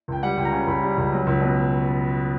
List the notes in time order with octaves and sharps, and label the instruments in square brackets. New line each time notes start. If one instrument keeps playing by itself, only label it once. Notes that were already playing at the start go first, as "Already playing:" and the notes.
[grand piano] C#2 G5
G3 F#5
C#2 G5
A#5
C#3
C#2 B5
G3
C#2
F#3
C#2
B2